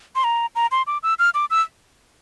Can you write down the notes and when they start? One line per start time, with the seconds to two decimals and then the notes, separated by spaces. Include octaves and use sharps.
0.15 C6
0.24 A#5
0.56 A#5
0.71 C6
0.87 D6
1.03 E6
1.19 F6
1.34 D6
1.50 E6